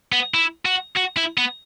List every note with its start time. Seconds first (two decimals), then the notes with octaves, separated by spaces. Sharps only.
0.12 B3
0.34 E4
0.65 F#4
0.96 F#4
1.17 E4
1.37 B3